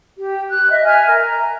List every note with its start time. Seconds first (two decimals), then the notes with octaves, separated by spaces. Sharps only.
0.17 G4
0.50 F#6
0.70 D#5 E5
0.85 E5 G#5 F6
1.07 A#4
1.21 A#5